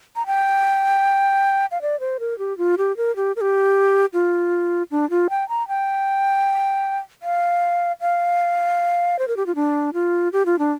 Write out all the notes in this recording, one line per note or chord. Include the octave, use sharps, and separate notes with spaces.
A#5
G5
F5
D5
C5
A#4
G4
F4
G4
A#4
G4
A#4
G4
F4
D4
F4
G5
A#5
G5
F5
F5
C5
A#4
G4
F4
D4
F4
G4
F4
D4